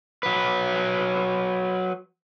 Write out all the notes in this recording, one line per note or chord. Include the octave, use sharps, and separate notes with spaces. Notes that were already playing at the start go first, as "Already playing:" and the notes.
F#3 B4